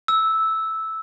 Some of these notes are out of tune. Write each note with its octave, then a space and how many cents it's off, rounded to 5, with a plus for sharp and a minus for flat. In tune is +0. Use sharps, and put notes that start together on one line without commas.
E6 -10